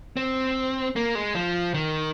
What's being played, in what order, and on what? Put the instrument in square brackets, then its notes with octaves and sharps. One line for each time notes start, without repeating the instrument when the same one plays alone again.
[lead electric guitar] C4
A#3
G#3
F3
D#3